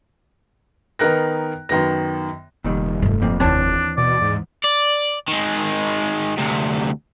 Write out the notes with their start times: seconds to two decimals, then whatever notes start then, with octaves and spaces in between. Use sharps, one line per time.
0.99 D#3 B3 D#4 A#4 F#6 A#6
1.69 F#2 D#3 B3 A#6
2.64 F1 A#2 D#3 G3
3.02 G2 A3
3.22 F3 A#3 C4
3.40 D#2 E3 C4 D4 C#5 A5
3.97 B2 D5
4.21 G#2
4.64 D5
5.28 D#3 G#3
6.37 D2 C3